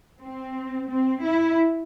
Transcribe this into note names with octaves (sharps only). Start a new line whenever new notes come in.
C4
C4
E4